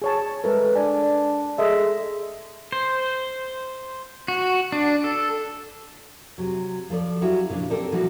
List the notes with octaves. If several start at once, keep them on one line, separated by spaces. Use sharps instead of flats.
G#4 C#5 A5
E3 G#3 A4 A#4
D4 D5 G#5
G#3 A4 D#5 E5
C5
F#4
D4
A4
C3 F#3
F3 A4 B4 D5
F#3 G3 C#4 E4 F#4 G4
A#2 C#3 F3 D4
C4 D#4 G4 A4 A#4 D5
A#2 E3 F3 G3 F#4